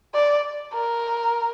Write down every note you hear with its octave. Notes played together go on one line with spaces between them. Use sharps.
D5
A#4